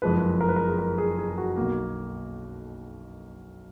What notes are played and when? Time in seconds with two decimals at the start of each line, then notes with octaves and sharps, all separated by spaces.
0.02 F#1 F2 F3 G#3 B4
0.41 A#4
0.49 B4
0.56 A#4
0.67 G#4
0.79 A#4
0.98 G#4
1.19 G#4
1.37 F#4
1.56 B1 B2 A#3